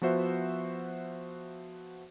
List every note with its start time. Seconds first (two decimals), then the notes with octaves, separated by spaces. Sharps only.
0.02 F3 B3 F#4 C5 E5